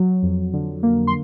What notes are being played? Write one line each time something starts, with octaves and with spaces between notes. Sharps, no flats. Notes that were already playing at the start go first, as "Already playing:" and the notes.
Already playing: F#3
F2
D3
A#3
C6